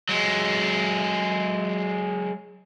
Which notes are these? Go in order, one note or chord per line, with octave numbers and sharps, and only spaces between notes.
F#3 G#3